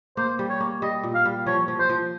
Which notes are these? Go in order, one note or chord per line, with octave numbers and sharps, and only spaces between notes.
A#3 C5
G3
C#5
A#3
G3 D#5
A#2
F5
G3
F3 C#5
F3
C5
F3